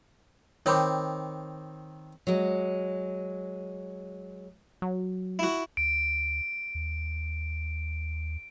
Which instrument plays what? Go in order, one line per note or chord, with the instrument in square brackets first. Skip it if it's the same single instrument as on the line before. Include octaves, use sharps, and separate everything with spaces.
[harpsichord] D#3 C4 [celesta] C#5 B5 D6
[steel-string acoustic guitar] F#3 G#3
[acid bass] F#3
[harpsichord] E4 F#4
[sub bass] D2 [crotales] D7
[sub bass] D#2